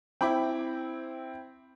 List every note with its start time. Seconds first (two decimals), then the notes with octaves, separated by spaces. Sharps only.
0.21 C4 E4 G5 B5 D6